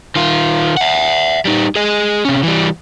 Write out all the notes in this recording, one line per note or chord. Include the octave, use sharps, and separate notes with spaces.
D#3 F4
E5 F#5
G3 D#4
G#4 D#5
C3 C#4
E3 G3